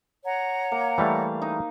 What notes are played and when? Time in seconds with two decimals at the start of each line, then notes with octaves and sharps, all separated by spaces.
0.25 C#5 F#5 A#5
0.72 A#3
0.98 E3 G3 A3 F5
1.42 D#4